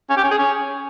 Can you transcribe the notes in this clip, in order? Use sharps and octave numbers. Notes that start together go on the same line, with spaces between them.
C#4
G4
C#4
G#4
C#4